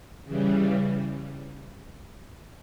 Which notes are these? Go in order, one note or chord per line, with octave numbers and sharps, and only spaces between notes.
C#3 E3 G3